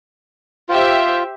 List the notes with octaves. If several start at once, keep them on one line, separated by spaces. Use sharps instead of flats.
F4 G4 C5 E5